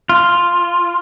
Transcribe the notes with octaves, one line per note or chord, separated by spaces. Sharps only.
F4